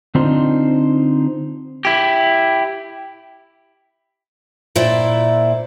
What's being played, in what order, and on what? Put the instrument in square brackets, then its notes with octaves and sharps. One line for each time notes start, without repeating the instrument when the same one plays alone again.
[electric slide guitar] D3 C4 D4 D#4 F4 C5
[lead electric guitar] E4 G4
[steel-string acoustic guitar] A#2 E4 C5 D5 E5